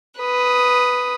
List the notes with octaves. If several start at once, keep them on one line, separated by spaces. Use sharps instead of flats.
B4 D#6